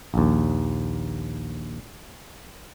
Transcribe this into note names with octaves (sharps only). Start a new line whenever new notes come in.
A#1 D#2